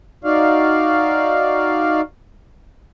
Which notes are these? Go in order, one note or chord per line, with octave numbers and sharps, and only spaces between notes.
D#4 F#4 D5 F5